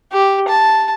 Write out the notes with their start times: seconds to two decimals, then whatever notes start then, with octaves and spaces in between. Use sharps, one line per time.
0.12 G4
0.48 A5